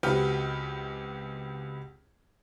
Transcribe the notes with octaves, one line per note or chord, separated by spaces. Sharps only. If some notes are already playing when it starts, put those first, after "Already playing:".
C#2 C4 F#4 G4 B4 F6